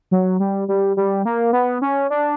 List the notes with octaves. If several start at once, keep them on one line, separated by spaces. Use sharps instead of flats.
F#3
G3
G3
G3
A#3
B3
C#4
D4